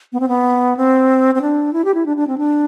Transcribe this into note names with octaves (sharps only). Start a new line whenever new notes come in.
B3
C4
B3
C4
C4
D4
E4
G4
E4
D4
D4
C4
D4